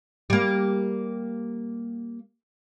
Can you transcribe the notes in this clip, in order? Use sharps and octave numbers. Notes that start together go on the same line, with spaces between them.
G3 A#3